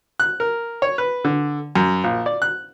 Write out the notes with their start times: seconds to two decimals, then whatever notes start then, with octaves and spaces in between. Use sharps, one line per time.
0.20 F#6
0.40 A#4
0.82 C#5
0.98 B4
1.25 D3
1.75 F#2
2.04 A#1
2.26 D5
2.42 F#6